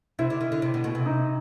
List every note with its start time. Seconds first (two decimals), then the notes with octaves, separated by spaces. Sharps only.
0.19 C3 E4
0.30 D3
0.41 D#3
0.52 D3
0.62 C3
0.74 B2
0.84 B2
0.95 C3
1.06 D#4